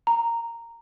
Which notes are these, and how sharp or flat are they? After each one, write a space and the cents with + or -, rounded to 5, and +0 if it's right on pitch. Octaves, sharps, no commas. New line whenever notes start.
A#5 -10